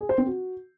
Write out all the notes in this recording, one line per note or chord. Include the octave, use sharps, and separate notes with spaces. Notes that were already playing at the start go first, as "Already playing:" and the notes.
G#4
C5
C4
F#4